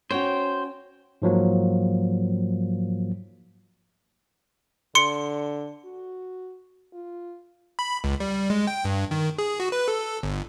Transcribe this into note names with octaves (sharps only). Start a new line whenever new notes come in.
C#4 F#4 C5 C#5 G5
G#2 F3 F#3 A#3
D3 C6 C#7
F#4
F4
B5
C#2
G3
G#3
G5
G2
D#3
G#4
F#4
B4
A4
G1